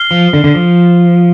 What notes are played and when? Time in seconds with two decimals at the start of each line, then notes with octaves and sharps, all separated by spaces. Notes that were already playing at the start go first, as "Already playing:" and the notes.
Already playing: F6 C7 G7
0.11 F3
0.33 D3
0.44 D3
0.55 F3